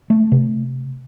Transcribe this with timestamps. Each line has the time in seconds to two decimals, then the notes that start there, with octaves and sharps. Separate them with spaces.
0.10 A3
0.32 C3